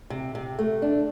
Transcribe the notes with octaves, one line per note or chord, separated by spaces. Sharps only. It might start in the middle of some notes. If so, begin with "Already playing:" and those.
C3
C3
A3
D4